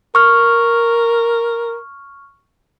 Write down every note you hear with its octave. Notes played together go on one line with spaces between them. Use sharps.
A#4 C#6 F6